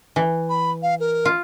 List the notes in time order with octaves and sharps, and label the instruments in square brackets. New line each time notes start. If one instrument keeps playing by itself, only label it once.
[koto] E3
[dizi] B5
F5
A#4
[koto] F4